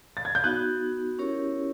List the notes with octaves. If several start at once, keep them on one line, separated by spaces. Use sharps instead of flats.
A6
G#6
G6
B3 D#4 F#4 F#6
C#4 E4 G4 A#4 C#5